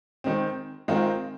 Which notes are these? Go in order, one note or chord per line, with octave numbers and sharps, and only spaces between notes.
D#3 G#3 C4
D#3 G#3 C4 F4 A#4